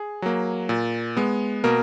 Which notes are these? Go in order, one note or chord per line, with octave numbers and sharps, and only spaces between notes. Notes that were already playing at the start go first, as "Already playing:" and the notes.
Already playing: G#4
F#3 A#3
A#2
G#3 B3
B2 A#3 A#4